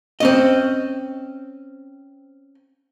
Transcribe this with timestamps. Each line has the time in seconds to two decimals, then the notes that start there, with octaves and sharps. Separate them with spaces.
0.20 C4 C#4 D#5